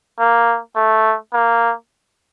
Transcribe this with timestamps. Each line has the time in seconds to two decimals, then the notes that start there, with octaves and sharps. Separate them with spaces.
0.19 A#3
0.76 A3
1.33 A#3